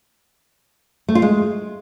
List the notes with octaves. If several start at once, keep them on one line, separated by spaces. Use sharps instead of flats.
A3
F4
G#3